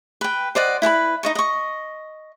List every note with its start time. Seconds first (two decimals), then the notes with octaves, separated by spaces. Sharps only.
0.21 B4 G5
0.55 C5 D5 D#5 F#5
0.82 E4 B4 G#5 B5
1.23 D#4 D#5 C#6
1.35 D#5 C#6